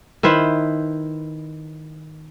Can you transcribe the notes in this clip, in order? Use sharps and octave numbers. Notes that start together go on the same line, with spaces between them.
D#3 E4 B4 C5